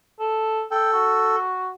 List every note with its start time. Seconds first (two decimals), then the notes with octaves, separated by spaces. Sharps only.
0.19 A4
0.71 A4 G5
0.93 F#4